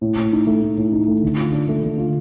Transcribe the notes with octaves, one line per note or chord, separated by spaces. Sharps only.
A2
A2
D#4
A3
A2
A2
D#4
A3
D3
F4
D4
A3
D3
F4